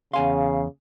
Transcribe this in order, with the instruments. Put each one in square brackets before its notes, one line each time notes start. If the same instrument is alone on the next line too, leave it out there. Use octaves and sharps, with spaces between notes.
[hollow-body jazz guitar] E2 G#5 C6 [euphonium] C#3 [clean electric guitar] F5